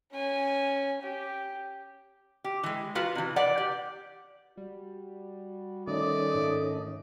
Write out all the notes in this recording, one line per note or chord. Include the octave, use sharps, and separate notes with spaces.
C#4 G#5
G4
G4
E3 G#3
F4 F#4 B4 F5
C3 E3
B4 D5 F#5
G4
G3 F#4
D#3 A3 C#4 D5 D#5
G#2